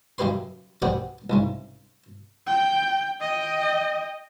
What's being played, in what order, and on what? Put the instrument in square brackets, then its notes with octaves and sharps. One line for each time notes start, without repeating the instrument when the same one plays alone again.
[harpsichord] F#2 C#3 G4 B4 C6
G4 G#4 B4 C5 D5 F#5
C2 G#2 C#3
[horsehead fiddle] G5
D#5 G5